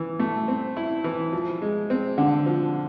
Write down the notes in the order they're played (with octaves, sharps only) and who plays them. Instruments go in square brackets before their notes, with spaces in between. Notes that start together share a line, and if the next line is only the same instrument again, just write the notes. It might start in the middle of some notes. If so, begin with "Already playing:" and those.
Already playing: [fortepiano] E3
A3
C4
E4
E3
F3
G#3
C4
D3
F3